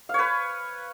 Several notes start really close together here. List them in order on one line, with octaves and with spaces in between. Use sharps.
F5 C#5 B4